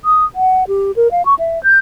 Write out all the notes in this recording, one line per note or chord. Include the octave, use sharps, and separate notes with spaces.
D#6
F#5
G4
A#4
F5
C#6
E5
G6